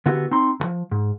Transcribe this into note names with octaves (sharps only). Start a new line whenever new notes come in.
D3 B3 E4 F#4 G4 A4
C4 D#4 C6
C#2 F3
G#2